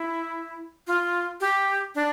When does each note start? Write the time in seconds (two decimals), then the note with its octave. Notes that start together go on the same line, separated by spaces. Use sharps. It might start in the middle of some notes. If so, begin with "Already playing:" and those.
Already playing: E4
0.87 F4
1.41 G4
1.95 D4